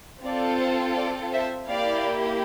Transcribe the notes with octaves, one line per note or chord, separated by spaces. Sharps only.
C4 F4 A4 D5
C5
D5
C5 E5
A#3 E4 G4 D5 F5